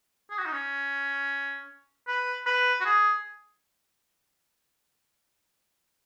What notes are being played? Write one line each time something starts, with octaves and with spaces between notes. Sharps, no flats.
G#4
F#4
D#4
C#4
B4
B4
F#4
G#4